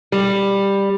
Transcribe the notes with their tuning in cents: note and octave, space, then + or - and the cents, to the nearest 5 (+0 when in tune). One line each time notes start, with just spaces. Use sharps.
G3 +10